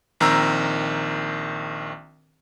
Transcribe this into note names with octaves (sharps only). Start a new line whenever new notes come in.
A#1 D#3 C4 A#4 A#5 E6